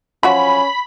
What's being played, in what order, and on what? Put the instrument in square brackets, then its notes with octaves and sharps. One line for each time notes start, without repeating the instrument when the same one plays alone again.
[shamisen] F3 F#3 F#4 [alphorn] C#4 [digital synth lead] B5